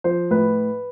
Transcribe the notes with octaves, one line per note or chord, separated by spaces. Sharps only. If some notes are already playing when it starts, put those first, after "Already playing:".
F3 C5
A2 B4